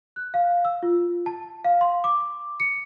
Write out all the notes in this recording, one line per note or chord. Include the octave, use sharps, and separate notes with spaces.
F#6
F5
E6
F4
A5
F5
C6
D6
C#7